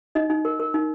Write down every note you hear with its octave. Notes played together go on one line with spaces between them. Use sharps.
D#4 D#5
D#4
A#4
A#4
D#4